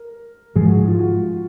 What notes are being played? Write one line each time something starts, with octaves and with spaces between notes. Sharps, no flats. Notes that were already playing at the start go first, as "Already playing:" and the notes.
Already playing: A#4
G#2 F3 G#3 G#4
F#4
F4
F4
F#4